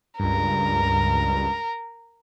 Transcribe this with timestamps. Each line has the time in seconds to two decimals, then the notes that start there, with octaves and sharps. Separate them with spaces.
0.20 C#2 G2 A#4